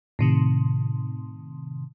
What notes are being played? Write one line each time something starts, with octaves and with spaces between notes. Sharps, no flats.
A2 C3 D#3